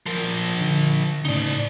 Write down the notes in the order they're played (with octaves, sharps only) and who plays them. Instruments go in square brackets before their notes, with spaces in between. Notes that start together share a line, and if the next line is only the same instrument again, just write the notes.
[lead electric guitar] F3 A#4
[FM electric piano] D3
[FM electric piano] A2 C#3 [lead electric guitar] D#4 D5